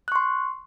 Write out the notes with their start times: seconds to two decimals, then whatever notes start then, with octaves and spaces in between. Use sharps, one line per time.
0.08 F#6
0.12 C#6
0.16 C6